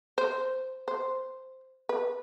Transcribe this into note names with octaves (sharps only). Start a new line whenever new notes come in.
C5
C5
B4